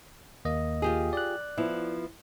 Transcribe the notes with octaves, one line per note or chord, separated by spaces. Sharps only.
D#2 A#3 D#5
F4 G4 G#4
D5 F#6
F3 B3 E4